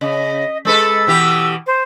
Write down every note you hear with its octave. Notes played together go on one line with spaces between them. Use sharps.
C#3 D#5
G#3 A4 B4 E6
B2 E3 G4
C5